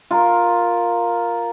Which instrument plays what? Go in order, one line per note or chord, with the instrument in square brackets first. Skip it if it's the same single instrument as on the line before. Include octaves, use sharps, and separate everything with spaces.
[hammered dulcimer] F4 A#4